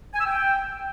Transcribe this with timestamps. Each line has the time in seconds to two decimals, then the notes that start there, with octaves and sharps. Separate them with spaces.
0.14 G#5
0.20 E6
0.26 G5